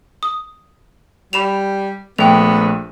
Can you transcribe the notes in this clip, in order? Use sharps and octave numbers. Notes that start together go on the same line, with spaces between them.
D#6
G3 B5 E7 F7
A#1 A3 B3 G5 F7